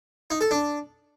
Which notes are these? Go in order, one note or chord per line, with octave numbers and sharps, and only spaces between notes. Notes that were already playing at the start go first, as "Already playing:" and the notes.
D#4
A4
D4